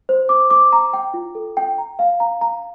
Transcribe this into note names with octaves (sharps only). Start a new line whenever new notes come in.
C5
D6
D6
A#5
G5
F4
A4
G5
A#5
F5
A#5
A#5